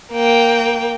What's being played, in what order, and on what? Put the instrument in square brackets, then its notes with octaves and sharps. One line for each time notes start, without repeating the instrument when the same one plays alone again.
[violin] A#3 G5